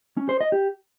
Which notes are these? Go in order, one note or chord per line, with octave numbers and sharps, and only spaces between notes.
C#4
C5
D#5
G4